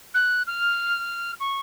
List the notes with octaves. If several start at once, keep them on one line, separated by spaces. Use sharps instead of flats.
F#6
F6
C#6